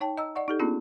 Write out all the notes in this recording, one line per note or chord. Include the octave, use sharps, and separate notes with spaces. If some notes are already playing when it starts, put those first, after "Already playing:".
D#4 C#5 G5 A5
D#5 A#5 E6
D5 D#5 F#5 C#6
D#4 G4 A4
A#3 B3 C#4 D4 F4 G#4